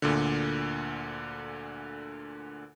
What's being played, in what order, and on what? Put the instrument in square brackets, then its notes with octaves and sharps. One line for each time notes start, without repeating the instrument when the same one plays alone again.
[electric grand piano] D2 A#2 D3